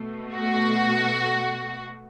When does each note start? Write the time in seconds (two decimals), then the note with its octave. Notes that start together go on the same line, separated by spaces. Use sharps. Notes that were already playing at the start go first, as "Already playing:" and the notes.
Already playing: B2 A3
0.35 F#4